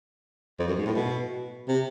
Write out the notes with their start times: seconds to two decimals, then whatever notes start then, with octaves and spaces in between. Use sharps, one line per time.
0.59 F2
0.68 F#2
0.78 G#2
0.86 A2
0.96 B2
1.68 C3